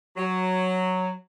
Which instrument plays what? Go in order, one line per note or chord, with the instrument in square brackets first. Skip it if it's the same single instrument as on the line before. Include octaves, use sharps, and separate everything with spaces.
[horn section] F#3